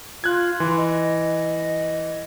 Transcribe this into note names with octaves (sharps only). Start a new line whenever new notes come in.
F4 F#6 G#6
E3 C6
D#5